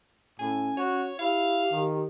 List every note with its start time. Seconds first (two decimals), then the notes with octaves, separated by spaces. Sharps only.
0.40 A2 C#4 G#5
0.78 F#4 C#5
1.20 E4 G4 F5
1.71 D#3